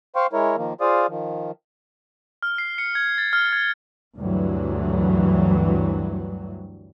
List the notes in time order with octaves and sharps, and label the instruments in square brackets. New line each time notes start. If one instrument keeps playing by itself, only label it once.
[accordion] C5 F5 G5 C6 C#6
G#3 E4 A#4 C#5
D#3 F3 A#3
F4 G#4 C5 D5 F5 D#6
D#3 F3
[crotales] F6
C7
C#7
G#6
A6
F6
G#6
[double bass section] D2 G2 E3 F#3